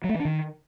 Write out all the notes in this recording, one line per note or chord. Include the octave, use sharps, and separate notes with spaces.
F#3
A3
E3
D4
D#3